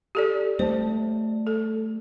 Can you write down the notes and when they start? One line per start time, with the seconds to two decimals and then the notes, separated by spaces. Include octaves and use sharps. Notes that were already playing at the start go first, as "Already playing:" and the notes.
0.15 G4 A4 D5
0.59 G3 A3 C5
1.47 A4